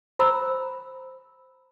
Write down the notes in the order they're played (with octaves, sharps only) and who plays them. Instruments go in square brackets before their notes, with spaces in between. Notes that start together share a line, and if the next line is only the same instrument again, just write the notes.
[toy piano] C5 A#5 B5 E6